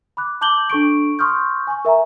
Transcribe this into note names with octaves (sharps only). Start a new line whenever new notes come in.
B5 D6 F#6
A5 D6 G6 F#7 G7
D4 A4 C#6 D7
C6 C#6 D#6 F6 G6
G#5 C#6
A#4 E5 G#5 A#5